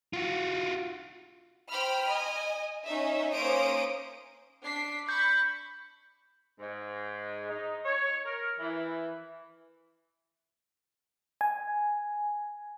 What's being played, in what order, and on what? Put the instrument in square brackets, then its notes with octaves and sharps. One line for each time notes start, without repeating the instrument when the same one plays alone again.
[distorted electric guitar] F4 F#4
[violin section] C5 G5 B5 F6
D#5 G#5
C#4 D#4 E5
A#3 C#4 C5 A#5 D#6 D7
D4 B6 C7
[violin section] B5 C#6 [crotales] G6
[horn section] G#2
D#4
C#5
A#4
E3
[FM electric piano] G#5